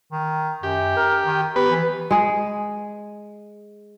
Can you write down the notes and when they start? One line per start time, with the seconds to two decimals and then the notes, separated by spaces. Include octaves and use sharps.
0.12 D#3
0.63 F#2 G4
0.97 A#4
1.26 D#3
1.56 B3 G4 B4
1.71 E3
2.11 G#3 G#4